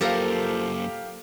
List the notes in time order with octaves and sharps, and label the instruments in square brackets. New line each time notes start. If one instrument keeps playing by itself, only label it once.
[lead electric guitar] F#2 A#3 [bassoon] F3 [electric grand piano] G4 F5 [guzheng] A4 A#4 A#5